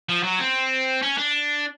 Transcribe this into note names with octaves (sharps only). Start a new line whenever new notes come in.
F3
F#3
C4
C#4
D4